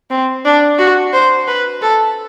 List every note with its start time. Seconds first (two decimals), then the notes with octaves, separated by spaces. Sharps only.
0.10 C4
0.45 D4
0.79 F#4
1.13 C5
1.47 B4
1.82 A4